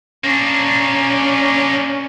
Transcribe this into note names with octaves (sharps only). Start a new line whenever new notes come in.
A#3 C#4 D4